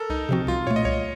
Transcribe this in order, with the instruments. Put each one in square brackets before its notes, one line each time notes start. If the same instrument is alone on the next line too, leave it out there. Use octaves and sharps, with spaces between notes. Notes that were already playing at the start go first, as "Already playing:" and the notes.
Already playing: [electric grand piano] A4 A#4
[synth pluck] C2 [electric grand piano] D#4
[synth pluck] C3 F3 C4 F#4
[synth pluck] C2 [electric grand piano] F4
[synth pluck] A#2 A3 [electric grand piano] C#5
[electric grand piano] D#5
[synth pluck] C2 [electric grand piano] C#5